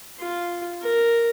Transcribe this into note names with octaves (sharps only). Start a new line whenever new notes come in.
F4
A#4